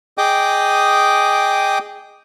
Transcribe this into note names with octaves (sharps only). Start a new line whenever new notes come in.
G#4 D#5 G5 D6 D#6